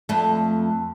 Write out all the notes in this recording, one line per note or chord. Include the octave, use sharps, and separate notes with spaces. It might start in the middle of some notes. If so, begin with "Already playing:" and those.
F2 A3